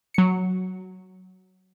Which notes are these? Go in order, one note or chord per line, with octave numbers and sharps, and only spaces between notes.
F#3 C#7